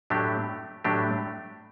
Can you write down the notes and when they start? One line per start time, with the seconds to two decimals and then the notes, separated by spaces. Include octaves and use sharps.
0.10 A2 F#3 A3 D4 G4
0.84 A2 F#3 A3 D4 G4